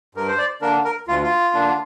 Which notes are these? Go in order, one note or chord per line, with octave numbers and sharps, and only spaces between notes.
G2 A#4
C5
D5
D3 A#3 D4 A#4
A#4
D2 F4
F4
D3 A#3 D4